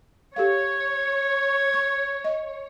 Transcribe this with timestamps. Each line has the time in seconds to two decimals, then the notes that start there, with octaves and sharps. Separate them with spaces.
0.36 G4 A4 C#5 F5 G#6
1.74 C#6
2.24 D#5